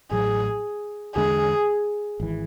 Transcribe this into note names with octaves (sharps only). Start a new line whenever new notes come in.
A1 A2 F#3 G#4
E2 D3 G#3 D4 G#4
G#1 E3